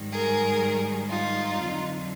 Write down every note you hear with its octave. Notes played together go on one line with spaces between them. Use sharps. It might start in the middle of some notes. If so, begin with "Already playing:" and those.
Already playing: G#2 D#3 G3
G#4 A#4
D#4 F4
F2 D3 F#3